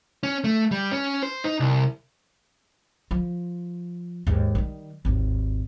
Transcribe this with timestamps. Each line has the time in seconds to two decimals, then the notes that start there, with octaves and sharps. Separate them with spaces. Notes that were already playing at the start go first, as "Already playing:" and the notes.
0.23 C#4
0.44 A3
0.71 G3
0.92 C#4
1.23 C5
1.44 D#4
1.60 C2
3.11 F3
4.27 D#2 G#2
4.55 D#3 G3
5.05 G#1 D#2